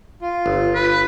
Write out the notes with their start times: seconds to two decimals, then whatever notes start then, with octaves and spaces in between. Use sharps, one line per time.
0.21 F4
0.46 G1
0.75 B4